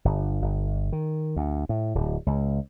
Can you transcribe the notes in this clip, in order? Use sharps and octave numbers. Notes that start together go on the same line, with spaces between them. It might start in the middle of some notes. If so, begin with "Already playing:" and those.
G1
G1
D#3
D2
A2
D1
C#2